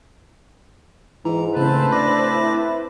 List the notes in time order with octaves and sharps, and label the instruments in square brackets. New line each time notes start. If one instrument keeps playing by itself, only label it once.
[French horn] G#2 [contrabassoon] E3 [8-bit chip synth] A#5
[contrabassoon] A2 [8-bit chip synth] C#3 C#4 [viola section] C4 B4 A5
[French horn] D4 [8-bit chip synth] B5 D6 A#6
[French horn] E4